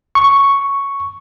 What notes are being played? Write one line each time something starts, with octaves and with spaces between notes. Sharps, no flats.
C#6